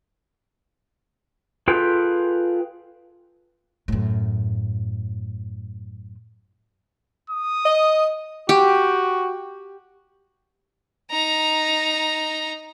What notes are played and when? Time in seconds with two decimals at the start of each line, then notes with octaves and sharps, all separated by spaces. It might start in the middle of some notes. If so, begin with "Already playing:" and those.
1.68 F4 G#4 A4 B4 G5
3.88 F#2 A2
7.30 D#6
7.65 D#5
8.49 F#4 G4
11.11 D#4 A#5